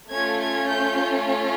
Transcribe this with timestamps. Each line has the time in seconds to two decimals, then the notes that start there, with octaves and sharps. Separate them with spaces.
0.10 A3 C#4 F4 G#6
0.40 G#6
0.69 G6